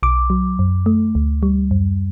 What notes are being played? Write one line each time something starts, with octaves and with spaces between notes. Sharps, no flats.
B1 D6
F#3
F#2
A3
D2
G3
F#2